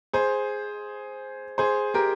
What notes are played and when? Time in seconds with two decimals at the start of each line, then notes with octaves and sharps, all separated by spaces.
0.13 G#4 C5
1.58 G#4 C5
1.94 G4 A#4